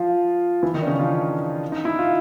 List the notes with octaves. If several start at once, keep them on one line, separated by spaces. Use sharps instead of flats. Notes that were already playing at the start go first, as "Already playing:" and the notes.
Already playing: F3 F4
E3 E4
D#3 D#4
D4
C#3 C#4
F3 F4
D#4
E4
F4